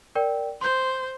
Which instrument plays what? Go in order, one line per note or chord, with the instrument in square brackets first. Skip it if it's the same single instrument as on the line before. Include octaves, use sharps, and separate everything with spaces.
[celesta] A#4 D5 G5
[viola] C5 [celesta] C6 G6